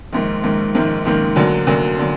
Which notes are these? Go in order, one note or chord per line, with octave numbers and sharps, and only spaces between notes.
A#1 G#2 D#3 A#3
A#1 G#2 D#3 A#3
A#1 G#2 D#3 A#3
A#1 G#2 D#3 A#3
D2 D3 F#3 A#3
D2 D3 F#3 A#3
D3 F#3